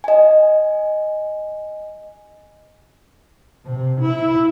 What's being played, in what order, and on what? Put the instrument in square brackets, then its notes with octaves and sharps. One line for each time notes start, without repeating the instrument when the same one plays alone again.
[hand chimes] D#5 G#5
[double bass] C3
E4